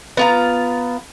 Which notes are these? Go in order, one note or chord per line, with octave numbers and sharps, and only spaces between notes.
B3 F4 A#5